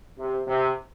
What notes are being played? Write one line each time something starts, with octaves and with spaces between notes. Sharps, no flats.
C3
C3